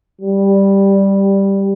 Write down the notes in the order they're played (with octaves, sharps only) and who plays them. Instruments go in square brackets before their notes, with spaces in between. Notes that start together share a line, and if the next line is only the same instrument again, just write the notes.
[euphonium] G3